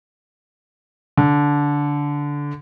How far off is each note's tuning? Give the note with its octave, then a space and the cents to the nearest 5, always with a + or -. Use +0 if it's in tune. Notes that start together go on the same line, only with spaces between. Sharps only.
D3 -15